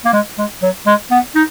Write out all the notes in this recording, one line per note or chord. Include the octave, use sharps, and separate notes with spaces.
A#3
G#3
G#3
F#3
G#3
B3
D#4